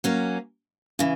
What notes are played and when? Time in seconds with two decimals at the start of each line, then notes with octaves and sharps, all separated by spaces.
0.04 F#3 A#3 C#4
0.99 C#3 E3